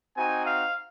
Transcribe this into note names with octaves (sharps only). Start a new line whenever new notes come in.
C4 D#4 F#4 G#5
F5